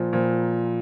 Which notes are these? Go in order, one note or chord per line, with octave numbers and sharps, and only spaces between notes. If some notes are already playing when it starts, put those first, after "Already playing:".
Already playing: A#2 F3
A#2 F3